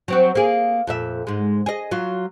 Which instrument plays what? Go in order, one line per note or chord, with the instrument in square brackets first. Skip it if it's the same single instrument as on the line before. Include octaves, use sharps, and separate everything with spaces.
[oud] F#3 C4 F#4
A#3 G#4
F2 A#2 E5
G#2 G#3
G#4 D#5
F#3 F4